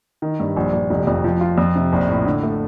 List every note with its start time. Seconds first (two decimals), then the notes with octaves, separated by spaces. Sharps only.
0.22 D#3
0.40 G2
0.56 A#1
0.73 A#1
0.90 F1
1.07 F2
1.24 F3
1.41 F4
1.58 F2
1.76 C3
1.93 A#1
2.09 A2
2.26 D3
2.43 A3